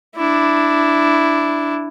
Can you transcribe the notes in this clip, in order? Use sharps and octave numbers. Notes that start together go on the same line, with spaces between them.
D4 E4